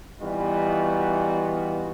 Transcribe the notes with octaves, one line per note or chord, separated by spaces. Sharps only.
E3 G3 B3 D#4 F4 F#4